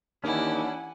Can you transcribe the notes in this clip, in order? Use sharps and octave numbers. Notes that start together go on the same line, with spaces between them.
D#2 E3 C#4 D4 E4 G4 F#5 G#5